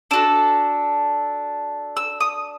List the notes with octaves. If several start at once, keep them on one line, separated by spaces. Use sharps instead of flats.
D4 F#4 A4 E6
E6
D#6